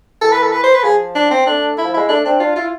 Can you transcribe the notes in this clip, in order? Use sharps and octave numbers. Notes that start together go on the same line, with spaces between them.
E3 A4
B4
A4
B4
C5
B4
F3 G#4
D4
C4
A3 D4
E4
F3
G#3 E4
A3 D4
C4 D4
D4 F4
E4 F4